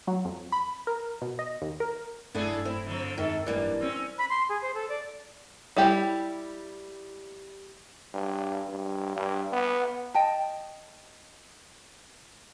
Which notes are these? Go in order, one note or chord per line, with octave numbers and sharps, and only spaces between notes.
F#3
F2
B5
A#4
B2
D#5
D#2
A#4
D1 G2 D3 A3 D4 E4 G#4 A4
C4 E4
D3 F3
F2 D#3 G#3 A4
D1 E3 G3 A#3 D4
C4 C#4
B5
C6
G#4
C5
A4
D5
G3 E4 G4
G2
G2
G2
B3
D#5 G5 A5